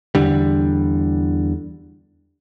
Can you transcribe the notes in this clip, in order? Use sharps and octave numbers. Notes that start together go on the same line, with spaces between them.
E2 D3 G3